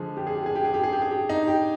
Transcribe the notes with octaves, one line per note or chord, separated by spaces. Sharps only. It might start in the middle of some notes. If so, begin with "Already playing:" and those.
Already playing: D3 F3 G#3 G#4
G4
G#4
G4
G#4
G4
G#4
G4
G#4
G4
G#4
G4
D#4
G4